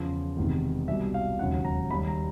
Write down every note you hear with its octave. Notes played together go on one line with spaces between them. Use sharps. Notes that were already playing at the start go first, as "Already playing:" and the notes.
Already playing: E2 C#3 F3
E1 E2 C3 D#3
C2 B2 G3 E5
F5
E1 D#2 C#3 F#3 F#5
A#5
D#2 D#3 G3 B5
A#5